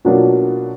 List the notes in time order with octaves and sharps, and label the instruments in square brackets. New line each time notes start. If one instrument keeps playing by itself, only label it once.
[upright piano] B2 F#3 A#3 D4 F4